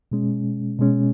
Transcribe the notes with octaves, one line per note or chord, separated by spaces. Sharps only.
B2 G#3 C#4
B2 G#3 C#4